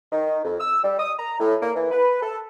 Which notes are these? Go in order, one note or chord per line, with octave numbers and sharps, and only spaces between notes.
D#3
F2
E6
G3
D#6
A#5
A2
A#3
E3
B4
A4